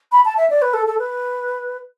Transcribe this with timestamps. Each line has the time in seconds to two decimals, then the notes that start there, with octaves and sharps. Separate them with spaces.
0.12 B5
0.25 A5
0.37 E5
0.50 D5
0.62 B4
0.74 A4
0.87 A4
0.99 B4